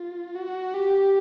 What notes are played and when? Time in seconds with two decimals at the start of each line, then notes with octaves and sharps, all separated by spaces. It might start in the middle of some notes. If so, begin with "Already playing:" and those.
Already playing: F4
0.35 F#4
0.74 G4